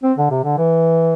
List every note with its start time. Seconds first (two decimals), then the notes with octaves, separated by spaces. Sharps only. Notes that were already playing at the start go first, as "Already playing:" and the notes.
0.03 C4
0.18 D3
0.31 C3
0.44 D3
0.58 E3